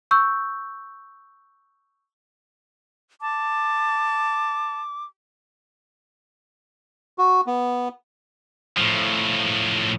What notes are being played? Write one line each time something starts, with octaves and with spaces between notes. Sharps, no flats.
C#6 E6 G6
A5 D6
F#4
B3
A2 F3